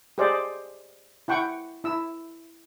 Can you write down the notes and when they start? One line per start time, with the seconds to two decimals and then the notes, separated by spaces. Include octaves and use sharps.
0.18 G4 G#4 C5 D5 D#5
1.28 E4 F#5 G5 C#6
1.84 E4 E6